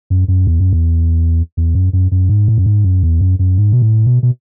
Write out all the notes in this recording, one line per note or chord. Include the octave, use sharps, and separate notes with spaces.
F#2
F#2
E2
F#2
E2
E2
F#2
F#2
F#2
G#2
A2
F#2
G#2
F#2
E2
F#2
F#2
G#2
B2
A2
B2
B2